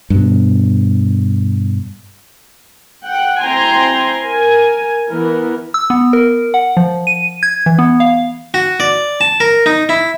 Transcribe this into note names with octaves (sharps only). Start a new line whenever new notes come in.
G2 B2
F#5 G5
C4 E4 G5 G#5 A#5 C6
A#4 G#5
E3 B3 A#4
E6
B3
A#4
F#5
F3
D#7
G#6
E3
B3
F5
F#4
D5
A5
A#4
D#4
E4